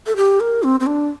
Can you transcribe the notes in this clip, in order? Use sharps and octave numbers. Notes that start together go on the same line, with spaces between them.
A4
G4
A#4
C4
C4
D4